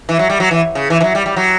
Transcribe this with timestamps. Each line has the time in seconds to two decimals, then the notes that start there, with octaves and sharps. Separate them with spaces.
0.09 E3
0.19 F#3
0.30 G3
0.40 F#3
0.51 E3
0.75 C#3
0.90 E3
1.01 E3
1.04 F#3
1.15 G3
1.26 G3
1.36 F#3